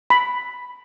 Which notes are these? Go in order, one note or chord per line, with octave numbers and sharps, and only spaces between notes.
B5